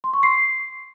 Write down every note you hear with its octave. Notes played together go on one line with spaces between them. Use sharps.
C6
C#6
C7